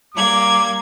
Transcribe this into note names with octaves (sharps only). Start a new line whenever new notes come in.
G3 A#3 D6 G#6